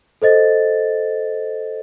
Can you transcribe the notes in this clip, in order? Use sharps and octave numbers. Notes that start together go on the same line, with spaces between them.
A4 C5 D#5 A6